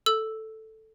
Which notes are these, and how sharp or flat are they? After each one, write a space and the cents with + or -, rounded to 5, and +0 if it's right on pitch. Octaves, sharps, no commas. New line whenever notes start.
A4 +0 E6 +0